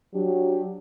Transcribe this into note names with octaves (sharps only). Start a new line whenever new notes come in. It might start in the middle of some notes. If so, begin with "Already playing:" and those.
F#3 D4 G4